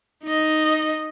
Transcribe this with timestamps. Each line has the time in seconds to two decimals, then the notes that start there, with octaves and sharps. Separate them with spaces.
0.24 D#4 D#5